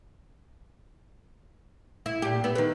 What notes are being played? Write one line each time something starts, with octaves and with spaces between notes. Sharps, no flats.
E4
A#2 G4
B3 E5
D#3 B4